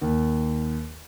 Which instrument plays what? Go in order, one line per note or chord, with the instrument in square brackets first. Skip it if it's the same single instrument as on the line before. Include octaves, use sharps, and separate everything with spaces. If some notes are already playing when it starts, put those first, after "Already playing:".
[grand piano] D#2